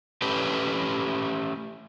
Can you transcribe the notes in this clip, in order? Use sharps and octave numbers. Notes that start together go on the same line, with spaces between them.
A3 C#4 G4 B4